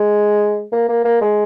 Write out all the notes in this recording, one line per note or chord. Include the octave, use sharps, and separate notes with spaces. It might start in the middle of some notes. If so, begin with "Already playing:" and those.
Already playing: G#3
A#3
A#3
A#3
G#3